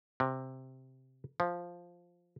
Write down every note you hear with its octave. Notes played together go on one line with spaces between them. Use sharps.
C3
F3